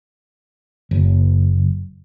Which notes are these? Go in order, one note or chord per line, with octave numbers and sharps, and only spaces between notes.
F#1